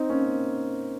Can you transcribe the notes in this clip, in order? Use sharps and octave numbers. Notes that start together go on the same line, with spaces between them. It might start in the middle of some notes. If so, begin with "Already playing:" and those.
Already playing: C4 D#4
A#3 C#4